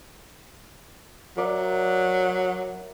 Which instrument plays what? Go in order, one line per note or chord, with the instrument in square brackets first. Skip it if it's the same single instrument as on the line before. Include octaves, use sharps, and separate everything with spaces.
[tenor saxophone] F#3 [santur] A#4 D5 E5